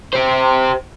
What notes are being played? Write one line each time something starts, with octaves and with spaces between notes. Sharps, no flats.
G4 C5